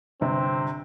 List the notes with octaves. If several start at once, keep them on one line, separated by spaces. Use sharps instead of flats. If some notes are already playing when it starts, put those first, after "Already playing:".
G1 C3 C4